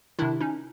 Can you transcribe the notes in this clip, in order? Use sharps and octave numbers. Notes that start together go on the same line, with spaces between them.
C3 D#3 D4 E4
C#4 D#4